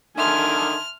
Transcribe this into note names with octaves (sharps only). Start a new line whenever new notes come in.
D3 D#3 E5 G#5 A5 C6 F6